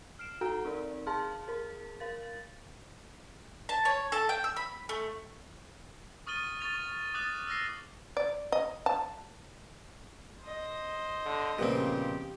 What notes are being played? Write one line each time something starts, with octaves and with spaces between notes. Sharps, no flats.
F6 C7 D7 E7
D#4 F#4 A4 F#5 A#5 D7
C4 D#4 A#4 D5
G#4 F5 A5 C6 F6
G#4 A#4
A#4 F5 A6
A5
C#5
A4
G5
E6
B5
A3
C#6 D#6 F6 A6 D#7 G7
C#6 A6 F7
D6 D#6 F#6 A6
E6 F6 A#6 C7
D5
D#5
A5
C5 D#5
D3
A#2 C#3 F3 B3 C4 G4